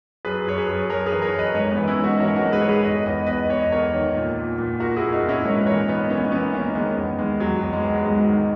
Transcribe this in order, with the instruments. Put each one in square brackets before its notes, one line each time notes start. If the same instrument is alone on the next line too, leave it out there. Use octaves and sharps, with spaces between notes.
[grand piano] F#2 G#4 B4
F#2 C#5
G#4 B4
F#2
F#2 A#4 C#5
A#4
G#4 B4
E3
A#4 C#5
F#2
B4 D#5
G#2 A#4 C#5
B3 D#4
E3
C#4 E4
G#2
D#4 F#4
E3 A#4 C#5
F#4 A#4
G#2
G#4 B4
G#2 C#5
G#4 B4
E2 D#5
E2 D#5
E2 B4 D#5
E2 C#5
D#5
E2 A#4 C#5
D#3
A#2
A#2
A#2
A#2 F#4 A#4
E4 G#4
A#2
D#4 F#4
A#2
C#4 E4
G#2 A#4 C#5
B4
E3 A#4 C#5
E3 B3 D#4
E3 A#3 C#4
B3
C#4
E3 B3 D#4
E3 A#3 C#4
D#3 G#3 B3
E2
D#3 G#3
E2 F#3
E2
G#3
E2
F#3
G#2 G#3
D#3